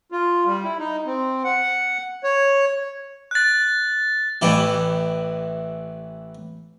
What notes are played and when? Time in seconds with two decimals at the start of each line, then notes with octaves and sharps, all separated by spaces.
0.12 F4
0.46 G3
0.64 E4
0.79 D#4
1.06 C4
1.44 F#5
2.24 C#5
3.31 F#6 A6
4.42 A1 E3 E4 G4